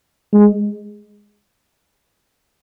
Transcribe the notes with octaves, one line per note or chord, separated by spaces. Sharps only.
G#3